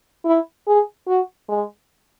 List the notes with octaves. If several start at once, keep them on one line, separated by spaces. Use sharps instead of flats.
E4
G#4
F#4
G#3